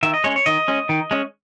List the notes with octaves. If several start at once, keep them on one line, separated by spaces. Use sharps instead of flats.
D#3 E5
D#5
G#3 C#4 C#5
C#5
D#3 D#5
G#3 C#4
D#3
G#3 C#4